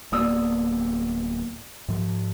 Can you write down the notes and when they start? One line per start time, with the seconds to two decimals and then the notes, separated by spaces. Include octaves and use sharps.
0.12 D1 A#3 B3 D5 D#6 E6
1.88 G#2 F3